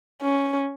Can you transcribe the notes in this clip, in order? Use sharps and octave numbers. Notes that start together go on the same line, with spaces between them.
C#4